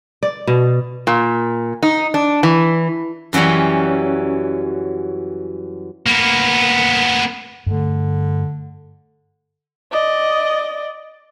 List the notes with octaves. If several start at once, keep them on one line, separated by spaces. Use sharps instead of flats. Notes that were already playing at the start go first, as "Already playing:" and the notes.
D5
B2
A#2
D#4
D4
E3
F#2 E3 F#3 G3 C#4
A#3 B3
G2 D3 A3
D5 D#5